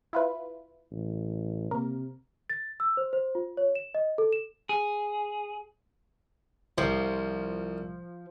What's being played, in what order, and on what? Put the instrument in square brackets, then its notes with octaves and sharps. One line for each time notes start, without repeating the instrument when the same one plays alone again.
[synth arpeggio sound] E4 F4 B4
[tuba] A1
[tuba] C3 [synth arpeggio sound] A#3 A#4
[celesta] A6
E6
C5
C5
F4
C#5
E7
D#5
A4
E7
[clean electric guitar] G#4
[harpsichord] C2 [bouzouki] F3